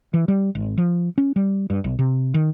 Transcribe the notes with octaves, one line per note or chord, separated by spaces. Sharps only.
E3
G3
G#1
F3
C#4
G3
G2
B1
C3
D#3